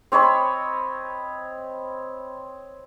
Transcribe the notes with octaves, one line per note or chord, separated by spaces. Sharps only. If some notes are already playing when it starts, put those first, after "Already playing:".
C4 C#5 D#5 B5